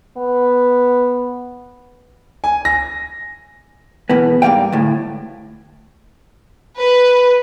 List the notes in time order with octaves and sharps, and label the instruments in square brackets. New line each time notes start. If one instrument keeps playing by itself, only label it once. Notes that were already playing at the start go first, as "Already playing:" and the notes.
[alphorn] B3
[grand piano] G#5
A#6
[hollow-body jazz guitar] E2 B2 E3 B3
G#2 G3 A#3 F5 G5
D2 A2
[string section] B4